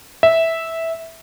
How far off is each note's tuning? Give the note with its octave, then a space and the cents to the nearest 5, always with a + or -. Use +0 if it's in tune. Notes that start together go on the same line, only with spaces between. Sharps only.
E5 -10